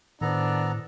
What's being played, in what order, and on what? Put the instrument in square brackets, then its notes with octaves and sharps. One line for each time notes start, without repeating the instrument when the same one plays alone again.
[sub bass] A2 [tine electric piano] D#3 C5 [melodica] B3 A4 A#5 [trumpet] D4